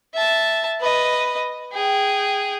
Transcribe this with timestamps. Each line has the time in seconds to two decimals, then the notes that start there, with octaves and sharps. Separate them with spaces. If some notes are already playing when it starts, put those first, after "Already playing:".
0.15 E5 A5
0.81 B4 D#5
1.73 G#4 G5